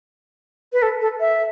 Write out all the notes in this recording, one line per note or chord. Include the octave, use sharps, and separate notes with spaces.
B4
A4
A4
E5